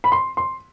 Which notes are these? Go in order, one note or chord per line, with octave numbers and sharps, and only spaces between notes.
B5
C6
C6